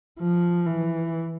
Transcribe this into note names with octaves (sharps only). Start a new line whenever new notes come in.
F3
E3